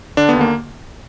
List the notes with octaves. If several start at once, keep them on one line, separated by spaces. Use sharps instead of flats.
D3 D4
D#2 B3
A#3